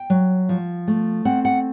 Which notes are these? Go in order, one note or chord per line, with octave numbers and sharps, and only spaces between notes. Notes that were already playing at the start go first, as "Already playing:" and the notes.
Already playing: G5
F#3
F3
A3
C4 F#5
F#5